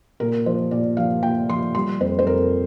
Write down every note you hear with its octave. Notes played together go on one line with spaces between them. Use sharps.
A#2 A#4
F3 C5
A#2 D5
F3 F5
A#2 G5
F3 C6
G3 C6
F2 C5
C5
F2 A#4